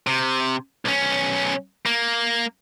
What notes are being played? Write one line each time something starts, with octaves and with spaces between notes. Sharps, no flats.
C3
B1 C#4
A#3